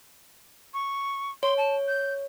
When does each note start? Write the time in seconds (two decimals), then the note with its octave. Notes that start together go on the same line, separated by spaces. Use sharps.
0.74 C#6
1.43 C#5 C6
1.58 A5
1.88 G6